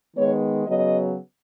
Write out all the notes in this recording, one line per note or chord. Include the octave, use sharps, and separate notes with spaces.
D#3 G#3 B3 C#5
C#3 F#3 B3 D#5